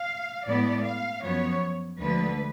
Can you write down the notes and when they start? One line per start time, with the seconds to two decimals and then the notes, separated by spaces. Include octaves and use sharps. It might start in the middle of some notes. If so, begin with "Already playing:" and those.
Already playing: F5
0.45 A2 G#3 B3 D5
0.84 F5
1.22 F#2 F3 B3 C#5
1.99 D2 D3 F3 G#3 B4